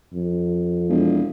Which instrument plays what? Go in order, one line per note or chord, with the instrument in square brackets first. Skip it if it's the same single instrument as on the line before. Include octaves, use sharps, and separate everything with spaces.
[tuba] F2
[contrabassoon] E1